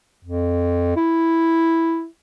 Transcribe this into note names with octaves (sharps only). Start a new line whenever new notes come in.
F2
E4